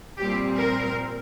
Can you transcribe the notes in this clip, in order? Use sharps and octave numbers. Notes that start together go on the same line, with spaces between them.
A#2 G3 C4 G4
A#4